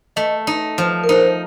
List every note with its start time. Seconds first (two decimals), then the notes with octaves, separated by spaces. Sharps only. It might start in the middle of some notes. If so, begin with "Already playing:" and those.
0.16 A3 D#5
0.47 D#4
0.78 F3
1.04 A#4
1.09 D#4 C5